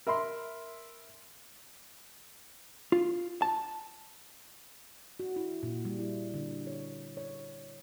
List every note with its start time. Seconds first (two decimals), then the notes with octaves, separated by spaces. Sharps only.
0.07 A#4 E5 B5 C6
2.92 F4
3.42 A5
5.20 F#4
5.36 E4
5.63 A#2
5.85 G3
5.99 E4
6.34 D3
6.67 C#5
7.17 C#5